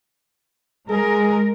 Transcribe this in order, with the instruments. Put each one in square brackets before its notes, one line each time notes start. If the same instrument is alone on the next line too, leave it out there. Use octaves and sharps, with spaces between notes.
[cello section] G#3 A#4 [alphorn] G#4